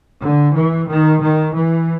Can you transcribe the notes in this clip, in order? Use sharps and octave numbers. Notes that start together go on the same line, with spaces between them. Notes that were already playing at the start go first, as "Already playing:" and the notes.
D3
E3
D#3
D#3
E3